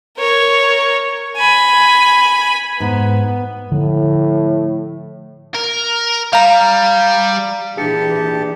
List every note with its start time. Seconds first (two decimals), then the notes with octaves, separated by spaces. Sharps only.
0.17 A#4 C#5
1.36 G#5 B5
2.80 G#2 B3
3.72 A2 D3 F3 A3
5.55 A#4
6.33 G3 F5 A#5
7.77 A#2 E3 D4 G4 G#4 A5 C#7